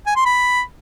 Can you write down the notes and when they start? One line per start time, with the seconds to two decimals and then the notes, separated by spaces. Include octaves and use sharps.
0.07 G#5
0.16 C6
0.25 B5